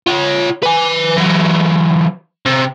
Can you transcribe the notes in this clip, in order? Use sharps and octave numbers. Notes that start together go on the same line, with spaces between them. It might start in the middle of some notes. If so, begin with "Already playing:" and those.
F4 C#5
B4 G#5
E3 F#3
C3